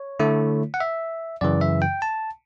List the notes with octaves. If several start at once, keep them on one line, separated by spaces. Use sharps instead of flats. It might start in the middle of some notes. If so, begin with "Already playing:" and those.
Already playing: C#5
D3 A3 E4
F#5
E5
F#2 C#3 E3 D5
E5
G5
A5